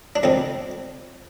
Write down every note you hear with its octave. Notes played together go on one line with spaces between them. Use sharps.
D4
F2 D#3 C4